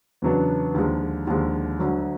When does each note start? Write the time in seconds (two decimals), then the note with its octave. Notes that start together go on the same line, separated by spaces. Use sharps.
0.22 E2 C#3 F#3 B3 D4
0.74 D#2 D3 F3 G#3
1.27 D#2 D3 F3 G#3
1.79 D2 D3 F#3